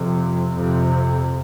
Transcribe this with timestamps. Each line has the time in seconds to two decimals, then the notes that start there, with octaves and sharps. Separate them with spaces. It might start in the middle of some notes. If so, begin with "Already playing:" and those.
Already playing: F2 C3
0.53 F2 C3